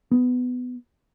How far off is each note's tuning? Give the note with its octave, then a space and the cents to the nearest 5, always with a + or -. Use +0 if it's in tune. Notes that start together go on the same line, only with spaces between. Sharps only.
B3 +15